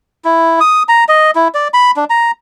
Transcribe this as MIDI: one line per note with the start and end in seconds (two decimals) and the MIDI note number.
0.25 0.60 64
0.60 0.83 87
0.89 1.04 82
1.08 1.31 75
1.35 1.48 64
1.54 1.68 74
1.74 1.91 83
1.96 2.05 62
2.10 2.31 82